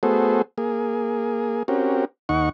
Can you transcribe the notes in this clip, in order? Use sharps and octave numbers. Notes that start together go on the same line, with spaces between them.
A3 B3 F#4 G#4 A4 C5
A#3 G#4
C4 C#4 F#4 G4 A#4
D#2 D#4 F#5 C#6